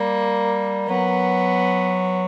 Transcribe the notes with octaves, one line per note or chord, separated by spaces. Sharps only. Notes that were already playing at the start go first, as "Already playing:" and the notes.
Already playing: G3 A#3
F#3 B3